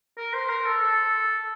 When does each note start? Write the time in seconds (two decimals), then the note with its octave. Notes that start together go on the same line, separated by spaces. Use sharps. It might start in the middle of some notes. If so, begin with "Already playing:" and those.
0.18 A#4
0.33 C5
0.49 A#4
0.65 A4
0.81 A4